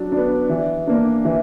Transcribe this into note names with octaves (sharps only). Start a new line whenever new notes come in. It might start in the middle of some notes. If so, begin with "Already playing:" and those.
Already playing: F#3 D4
B3 D4
E3
A#3 D4
E3